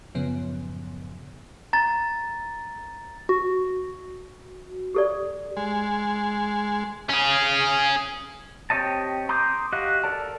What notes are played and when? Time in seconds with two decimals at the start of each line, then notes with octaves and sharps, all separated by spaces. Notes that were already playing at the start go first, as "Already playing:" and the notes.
0.15 F#2 A2 C#3 F3 B3
1.73 A#5 A6
3.29 F#4
4.94 G4 A4 D5
5.57 G#3
7.09 C#4 G#4
8.70 C4 G4 C#5 D#5 A5
9.29 A#5 C6 D6 D#6 G6
9.72 F#4 G4 D#5 F5 F#6
10.04 A4 A#4 D5 A5